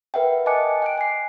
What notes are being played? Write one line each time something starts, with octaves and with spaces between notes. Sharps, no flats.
A#4 B4 E5 F#5 G5
D#5 G#5 A5 D6 F#6 C#7
G5 F#6 D7
G#5 C7